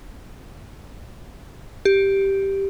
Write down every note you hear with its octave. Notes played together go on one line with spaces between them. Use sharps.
G4